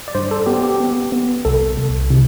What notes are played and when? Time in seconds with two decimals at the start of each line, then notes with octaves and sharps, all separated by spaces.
0.08 D5
0.15 G2 C5
0.31 A4
0.46 B3 G4
0.63 G4
0.80 B3
1.12 B3
1.45 C2 A4
1.77 C2
2.10 C3